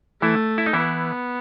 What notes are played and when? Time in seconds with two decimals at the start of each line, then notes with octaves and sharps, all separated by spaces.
0.22 E3 A3 E4
0.58 E4
0.66 D#4
0.73 E3 B3 E4